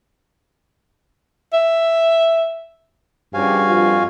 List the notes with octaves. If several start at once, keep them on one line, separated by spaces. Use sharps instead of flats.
E5
G2 C#3 F3 F#4 G4 F5 G#5
F2 F3 F4